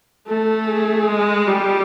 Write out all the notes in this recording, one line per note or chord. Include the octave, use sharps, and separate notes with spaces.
A3 A4
G#4
G#3
G3 G4